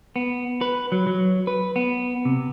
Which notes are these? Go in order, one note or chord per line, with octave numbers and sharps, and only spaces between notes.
B3
B4
F#3
F#3
B4
B3
C3